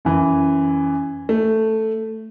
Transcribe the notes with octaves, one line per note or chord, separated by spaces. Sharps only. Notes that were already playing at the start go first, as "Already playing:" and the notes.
F#2 E3
A3